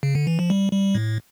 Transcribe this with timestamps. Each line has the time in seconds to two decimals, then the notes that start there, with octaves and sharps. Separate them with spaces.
0.03 C#3
0.15 D3
0.27 E3
0.39 F3
0.50 G3
0.73 G3
0.95 A2